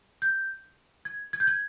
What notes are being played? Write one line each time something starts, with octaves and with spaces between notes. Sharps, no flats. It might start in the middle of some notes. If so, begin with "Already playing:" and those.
G6
G#6
G#6
G6
G#6